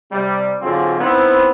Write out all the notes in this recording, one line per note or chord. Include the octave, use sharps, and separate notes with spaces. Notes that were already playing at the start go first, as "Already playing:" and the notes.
C3 G3
G#2 D3 F#3 C4 F4 G#4
B3 C4 D#4 E4 C5